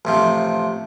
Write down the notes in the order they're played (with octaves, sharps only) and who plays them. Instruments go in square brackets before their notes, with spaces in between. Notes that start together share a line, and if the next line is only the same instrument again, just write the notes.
[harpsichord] A1 C3 F3